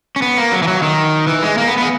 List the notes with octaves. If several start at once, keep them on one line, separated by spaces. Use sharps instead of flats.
C#4
B3
A#3
F#3
E3
F#3
D#3
E3
G#3
A#3
B3
B3 G#4